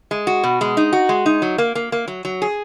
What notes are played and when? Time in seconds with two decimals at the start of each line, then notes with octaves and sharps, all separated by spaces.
0.11 G#3
0.27 F#4
0.44 B2
0.61 G#3
0.77 D#4
0.93 F#4
1.09 G#3
1.26 D#4
1.42 F#3
1.58 A#3
1.75 A#3
1.92 A#3
2.08 F#3
2.25 F#3
2.42 G#4